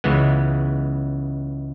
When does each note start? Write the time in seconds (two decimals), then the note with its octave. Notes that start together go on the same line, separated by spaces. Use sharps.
0.04 C#2 C#3 E3 G#3 B3